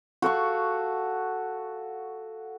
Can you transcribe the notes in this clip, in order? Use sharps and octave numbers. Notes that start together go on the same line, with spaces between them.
F#4 A4 F5 C#6